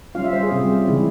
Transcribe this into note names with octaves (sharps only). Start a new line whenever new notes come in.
G3 C#4 F4 F5
E5
C5
G#4
C3 G3 C4 F4
C#3 E3 G#3 E4